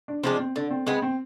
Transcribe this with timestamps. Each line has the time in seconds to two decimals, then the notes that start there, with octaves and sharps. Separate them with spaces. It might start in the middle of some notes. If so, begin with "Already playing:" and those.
0.08 D4
0.24 F3 G#3 C4 D4
0.39 C4
0.56 D3 D4
0.70 C4
0.86 G#3 B3 C4
1.02 C4